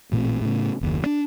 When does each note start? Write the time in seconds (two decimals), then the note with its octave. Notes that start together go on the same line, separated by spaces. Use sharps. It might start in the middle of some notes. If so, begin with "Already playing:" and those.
0.12 A1 A#2 A3 C4
0.41 A2 C#3
0.81 F#1 D#2
1.02 D#3 D4